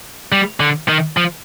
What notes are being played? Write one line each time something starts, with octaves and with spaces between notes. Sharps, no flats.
G3
D3
D#3
F3